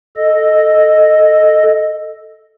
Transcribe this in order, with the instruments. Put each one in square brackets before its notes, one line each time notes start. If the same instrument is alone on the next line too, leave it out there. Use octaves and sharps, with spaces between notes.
[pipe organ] A4 D#5